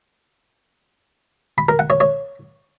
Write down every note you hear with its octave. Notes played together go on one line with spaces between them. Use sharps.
B5
A#4
F#5
C#5
C#5